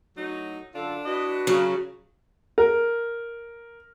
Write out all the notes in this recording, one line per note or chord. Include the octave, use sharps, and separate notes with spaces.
A2 F#3 D#4
F#2 D3 D4 F4 A4
E4 F#4 B4 D#5 F#6
C#3 F#3
A#4